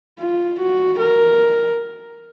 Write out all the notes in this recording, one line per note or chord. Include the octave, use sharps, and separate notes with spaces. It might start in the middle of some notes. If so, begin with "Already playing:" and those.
F4
F#4
A#4